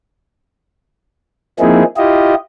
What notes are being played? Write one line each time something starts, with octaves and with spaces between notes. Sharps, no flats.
F3 A#3 C4 D#4 E4 G#4
E4 F4 G4 D#5